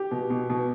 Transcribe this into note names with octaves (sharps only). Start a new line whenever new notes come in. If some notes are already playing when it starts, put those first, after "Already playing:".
Already playing: G4
B2
B2
B2